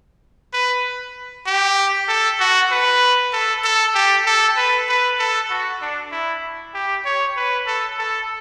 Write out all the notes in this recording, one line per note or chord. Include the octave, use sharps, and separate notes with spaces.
B4
G4
A4
F#4
B4
A4
A4
G4
A4
B4
B4
A4
F#4
D4
E4
G4
C#5
B4
A4
A4